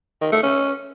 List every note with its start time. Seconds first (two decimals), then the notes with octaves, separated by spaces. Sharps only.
0.21 D#3
0.32 A3
0.43 C#4